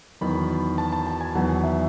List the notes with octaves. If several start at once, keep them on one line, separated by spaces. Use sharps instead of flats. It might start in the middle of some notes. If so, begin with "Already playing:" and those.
E2 D#3 F#3 B5
A5
A5
A5
G#5
E2 D#3 F#3 F#5
E5